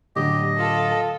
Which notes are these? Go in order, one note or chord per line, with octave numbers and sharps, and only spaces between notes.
A2 D3 F#3 G4 D#5
F4 A4